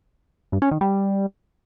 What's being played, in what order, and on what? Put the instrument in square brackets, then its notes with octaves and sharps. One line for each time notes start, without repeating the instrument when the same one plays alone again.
[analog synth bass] G2
C#4
D#3
G3